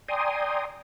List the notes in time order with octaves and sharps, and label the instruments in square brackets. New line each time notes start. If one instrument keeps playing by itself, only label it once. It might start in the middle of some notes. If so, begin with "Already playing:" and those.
[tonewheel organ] D5 G5 G#5 A#5 C6 D#6